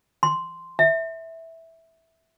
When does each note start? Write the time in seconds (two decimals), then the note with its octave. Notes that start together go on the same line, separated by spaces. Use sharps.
0.23 C6
0.79 E5